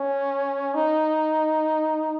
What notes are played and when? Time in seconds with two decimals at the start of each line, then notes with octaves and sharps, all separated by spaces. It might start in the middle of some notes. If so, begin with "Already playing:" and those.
Already playing: C#4
0.74 D#4